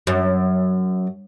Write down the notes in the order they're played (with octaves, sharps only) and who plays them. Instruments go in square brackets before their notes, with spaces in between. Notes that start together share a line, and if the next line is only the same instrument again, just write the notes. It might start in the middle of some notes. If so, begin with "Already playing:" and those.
[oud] F#2